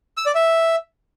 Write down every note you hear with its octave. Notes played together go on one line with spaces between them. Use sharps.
E6
D5
E5